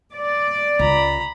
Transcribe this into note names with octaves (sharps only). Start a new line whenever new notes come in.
D5
C#2 A#5 B5